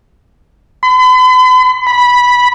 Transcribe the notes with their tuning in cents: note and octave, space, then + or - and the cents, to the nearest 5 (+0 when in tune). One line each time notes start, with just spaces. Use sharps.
B5 +45
B5 -10